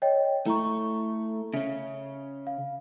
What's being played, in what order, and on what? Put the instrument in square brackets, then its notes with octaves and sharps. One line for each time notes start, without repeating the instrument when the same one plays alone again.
[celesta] C#5 D#5 G5
[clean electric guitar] A3 [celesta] E4 A#5 C#6
[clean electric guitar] C#3 C#4 [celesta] E5
[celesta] F5